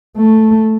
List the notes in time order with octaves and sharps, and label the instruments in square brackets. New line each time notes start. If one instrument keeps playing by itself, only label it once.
[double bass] A3